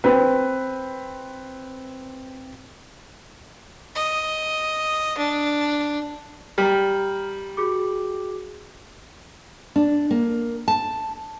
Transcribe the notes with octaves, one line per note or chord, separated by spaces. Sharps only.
C4 B4
D#5
D4
G3 A#5 F6
F#4 G#4 D6
D4
A#3
A5